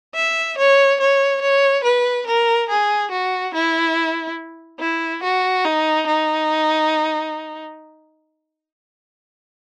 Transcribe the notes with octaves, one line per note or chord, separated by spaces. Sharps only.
E5
C#5
C#5
C#5
B4
A#4
G#4
F#4
E4
E4
F#4
D#4
D#4